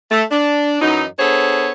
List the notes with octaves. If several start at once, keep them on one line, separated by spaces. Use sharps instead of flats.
A3
D4
F#2 E3 F#3 D#4
B3 D4 G#4 A4 C5 C#5